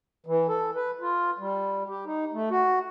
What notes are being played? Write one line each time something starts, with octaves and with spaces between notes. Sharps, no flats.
E3
A4
B4
F4
G3
G4
D#4
A3
F#4